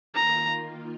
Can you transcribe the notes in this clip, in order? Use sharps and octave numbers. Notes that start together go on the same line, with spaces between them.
D#3 A#3 F4 A#5